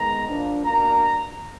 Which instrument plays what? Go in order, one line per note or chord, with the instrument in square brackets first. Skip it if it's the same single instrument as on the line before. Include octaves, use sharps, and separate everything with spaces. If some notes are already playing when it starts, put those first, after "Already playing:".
Already playing: [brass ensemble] D#3 G#3 B3 A#5
F3 A#3 D4
B2 A#3 D4 A#5